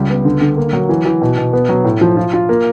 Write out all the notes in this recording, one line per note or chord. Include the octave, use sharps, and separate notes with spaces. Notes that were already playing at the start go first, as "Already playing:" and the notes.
Already playing: C#2 G3
B3
D3
D3
A#3
F#3
E3
E3
B2
B2
B3
F#3
A2
F3
F4
F4
A#3